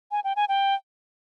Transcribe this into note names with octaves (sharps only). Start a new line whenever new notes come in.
G#5
G5
G#5
G5